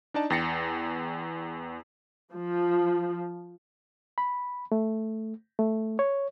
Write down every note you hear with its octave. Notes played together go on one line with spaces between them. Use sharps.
D4 D#4 D5 A5
E2 G5 A6 A#6 C7 C#7
F3
B5
A3
A3
C#5